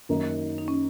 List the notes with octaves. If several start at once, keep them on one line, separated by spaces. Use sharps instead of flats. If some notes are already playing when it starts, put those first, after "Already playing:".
F#2 D#3 A#3 D#4
D#4
C#4